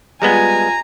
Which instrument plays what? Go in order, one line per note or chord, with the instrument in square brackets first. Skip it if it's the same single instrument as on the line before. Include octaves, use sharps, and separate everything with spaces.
[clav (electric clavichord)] G3 G#3 B3 [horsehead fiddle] F4 G#5 [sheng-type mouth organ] A#5